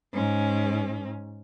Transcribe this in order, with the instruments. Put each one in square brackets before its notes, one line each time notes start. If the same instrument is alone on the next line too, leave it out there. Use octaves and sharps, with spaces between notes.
[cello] G#2 C#4